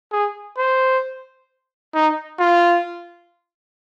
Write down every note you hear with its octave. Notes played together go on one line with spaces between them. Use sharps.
G#4
C5
D#4
F4